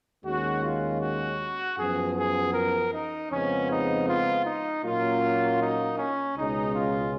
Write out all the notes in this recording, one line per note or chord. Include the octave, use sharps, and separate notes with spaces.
D#2 D#3 G#3 C#4 F#4
F4
F#4
F#2 F3 B3 G#4
G#4
A#4
D#4
F2 C#3 F3 G#3 B3 C#4
D#4
F4
D#4
A#2 F#3 A#3 C#4 F4
D#4
C#4
C#2 B2 G#3 C#4 D#4
F4